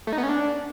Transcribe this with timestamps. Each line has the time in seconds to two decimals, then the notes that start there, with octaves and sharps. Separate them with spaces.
0.07 A3
0.13 D#4
0.18 B3
0.23 C#4
0.29 D4